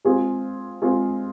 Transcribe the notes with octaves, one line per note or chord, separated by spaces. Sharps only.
G#3 C4 F4 G#4
G#3 C4 F4 G#4